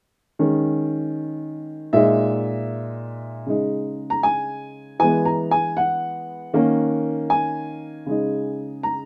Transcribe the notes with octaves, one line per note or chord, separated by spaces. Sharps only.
D#3 G#3 C#4
A#2 G#3 D#4 E5
C#3 G#3 D#4
A#5
G#5
E3 G#3 B3 G#5
A#5
G#5
F#5
D#3 A#3 C#4
G#5
C#3 G#3 D#4
A#5